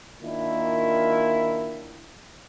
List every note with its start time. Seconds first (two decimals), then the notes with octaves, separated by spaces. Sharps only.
0.22 D#3 A#3 D4 E4 F4